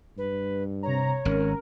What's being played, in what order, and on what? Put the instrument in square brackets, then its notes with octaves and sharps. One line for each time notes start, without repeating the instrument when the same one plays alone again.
[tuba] G2 [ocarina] B4
[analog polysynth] C3 A#5 [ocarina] C#5
[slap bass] G#1 [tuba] C#4 [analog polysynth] A#4